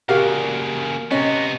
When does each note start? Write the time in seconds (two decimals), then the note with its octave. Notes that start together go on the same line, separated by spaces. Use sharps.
0.09 A#2 C#3 F#4 G4 A#4 F5
1.11 C3 B3 C#4 D#5